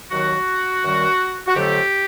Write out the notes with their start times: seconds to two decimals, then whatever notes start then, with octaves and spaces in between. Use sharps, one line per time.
0.11 D#2 D#3 F#3 F#4
0.83 F#2 D#3 G3
1.47 F#4
1.55 F2 D3 F#3 A3 G4